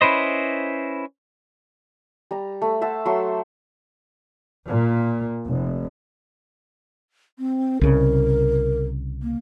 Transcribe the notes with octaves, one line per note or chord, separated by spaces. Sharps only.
C#4 E4 B4 C5 D#5
G3 A#5
A3
C5 E5 F#5 A5
F#3 A3 C6
A#2
F1
C4
C2 C#3 A#4
A#3